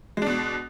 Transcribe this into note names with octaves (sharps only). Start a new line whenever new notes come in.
B2 G#3 D4